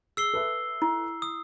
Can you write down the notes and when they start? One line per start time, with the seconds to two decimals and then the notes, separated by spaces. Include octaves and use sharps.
0.17 G#4 E6 C7 G7
0.34 A4 B4 E5
0.82 E4
1.22 D#6